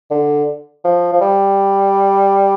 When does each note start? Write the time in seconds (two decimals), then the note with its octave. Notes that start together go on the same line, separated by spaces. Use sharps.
0.11 D3
0.85 F3
1.13 F3
1.21 G3